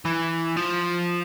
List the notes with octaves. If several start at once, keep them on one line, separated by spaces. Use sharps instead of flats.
E3
F3